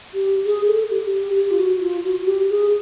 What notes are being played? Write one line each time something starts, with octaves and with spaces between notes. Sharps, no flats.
G4
G#4
A4
G4
G4
G4
F4
F#4
F4
F#4
F#4
G4
G#4